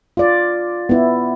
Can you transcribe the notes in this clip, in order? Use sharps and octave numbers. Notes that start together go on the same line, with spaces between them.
F4 D5
B3 E4